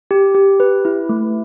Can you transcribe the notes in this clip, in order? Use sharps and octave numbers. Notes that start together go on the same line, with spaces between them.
G4
G4
B4
E4
A3